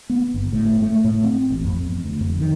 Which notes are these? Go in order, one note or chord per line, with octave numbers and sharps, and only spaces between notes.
B3
G1
A2
A3
A2
C4
A1
F2
E2
D2
F2
D#3